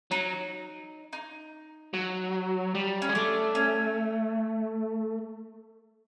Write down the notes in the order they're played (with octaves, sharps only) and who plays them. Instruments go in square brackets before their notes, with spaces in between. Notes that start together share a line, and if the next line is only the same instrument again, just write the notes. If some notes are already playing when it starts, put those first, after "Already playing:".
[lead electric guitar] F#3 [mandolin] D#4
[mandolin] D#4
[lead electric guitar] F#3
G3
[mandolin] C#4
[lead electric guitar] G#3
[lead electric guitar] A3 [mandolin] D4
[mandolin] C#4